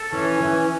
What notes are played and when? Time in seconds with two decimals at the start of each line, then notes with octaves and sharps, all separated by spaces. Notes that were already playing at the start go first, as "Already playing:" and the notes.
Already playing: A4
0.12 E3 C#4
0.40 E3